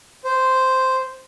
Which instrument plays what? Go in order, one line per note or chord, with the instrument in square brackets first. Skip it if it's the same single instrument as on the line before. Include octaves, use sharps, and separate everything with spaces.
[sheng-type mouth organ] C5